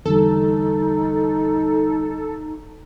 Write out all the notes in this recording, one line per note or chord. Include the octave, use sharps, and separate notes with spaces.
E2 D3 G3 D#4 A4